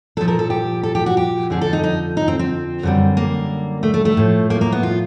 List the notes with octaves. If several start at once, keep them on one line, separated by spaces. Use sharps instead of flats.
A#2 F3 A4
A#4
A4
G4
A4
G4
F#4
G4
F2 D3 F3 G#4
A4
D#4
D#4
D#4
C4
C4
F#2 D3 G3
A#3
A3
A3
A3
A2 F3
A#3
A#3
B3
F4